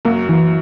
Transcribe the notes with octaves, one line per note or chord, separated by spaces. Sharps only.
F#2 F#3 A#3
E3